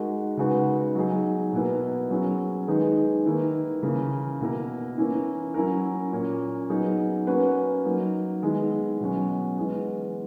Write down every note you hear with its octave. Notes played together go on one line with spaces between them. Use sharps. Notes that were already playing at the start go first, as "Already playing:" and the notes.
Already playing: G#3 D#4 F#4 A#4
C#3 G#3 D#4 F#4 B4
F#3 B3 D#4 G#4
B2 A#3 E4 B4
F#3 C#4 E4 G#4
D#3 G#3 D#4 G#4 B4
D#3 A#3 E4 B4
C#3 E3 A#3
B2 A#3 E4 A#4
E3 A#3 C#4 E4
F#3 C#4 E4 A#4
A#2 A#3 C#4
F#3 B3 D#4 G#4
A#3 C#4 F#4 B4
F#3 A#3 D#4
D#3 G#3 B3 E4 G#4
B2 F#3 C#4
E3 G#3 B3